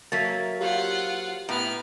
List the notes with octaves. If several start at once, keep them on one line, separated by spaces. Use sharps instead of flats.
F#3 A#3 A4 E5 A6 B6
F4 G4 C5 C#5 F5 F#5
A2 B3 A#5 F6